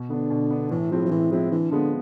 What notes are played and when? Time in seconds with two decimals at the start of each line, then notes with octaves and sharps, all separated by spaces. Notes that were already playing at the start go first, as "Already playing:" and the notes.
Already playing: B2
0.09 D3 B3 D4
0.30 B2
0.50 B3 D4
0.71 A2 E3
0.91 F3 G#3 C4 E4
1.05 F3
1.11 A2 E3
1.31 F3 G#3 C4 E4
1.51 D3 E3
1.71 D3 F3 G#3 B3